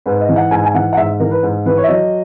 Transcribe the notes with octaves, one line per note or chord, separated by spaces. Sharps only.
G#2 B4
D#5
E3
F#5
G#2 G#5
G#5
E3 F#5
F#5
G#2 E5
E3 A#4
B4
G#2
E3 B4
C#5
E5
F#3 D#5